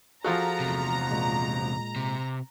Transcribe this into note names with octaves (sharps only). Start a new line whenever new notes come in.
F3 F4 F#4 G#4 A4 A#5
E2 C3
A#2 G#3
C3